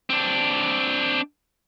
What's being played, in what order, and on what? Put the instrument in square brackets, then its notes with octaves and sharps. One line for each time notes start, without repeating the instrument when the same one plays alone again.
[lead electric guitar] C4 D4